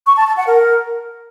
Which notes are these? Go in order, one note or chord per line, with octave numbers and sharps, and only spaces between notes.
C#6
A5
A5
F#5
A#4